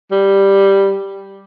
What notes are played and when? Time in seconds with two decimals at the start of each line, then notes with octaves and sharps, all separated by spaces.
0.11 G3